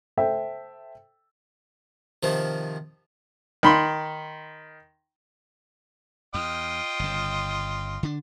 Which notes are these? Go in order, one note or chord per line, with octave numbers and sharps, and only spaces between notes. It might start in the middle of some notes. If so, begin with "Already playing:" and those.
A4 C5 E5 G5
C3 D#3 F3
D#3 B5 C6
E2 F4 D#5 G5
G1 C#3
D3 D4